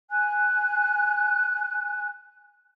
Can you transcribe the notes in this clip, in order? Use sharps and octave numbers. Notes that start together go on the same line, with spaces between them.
G#5 F#6